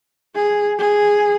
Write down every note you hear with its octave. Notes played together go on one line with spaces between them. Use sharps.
G#4
G#4